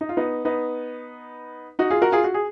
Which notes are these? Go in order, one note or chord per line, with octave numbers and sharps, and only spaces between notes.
D#4
F4
B3 D#4
B3 D#4
D#4 F#4
F4 G#4
F#4 A#4
F4 G#4
F#4
G#4